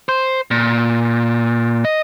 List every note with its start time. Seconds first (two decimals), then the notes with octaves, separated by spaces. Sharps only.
0.09 C5
0.51 A#2
1.85 D#5